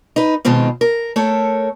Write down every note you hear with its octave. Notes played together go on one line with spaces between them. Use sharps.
D#4 B4
B2 D#3 G#3 C4 F4
A#4
A3 A4 A#4 C#5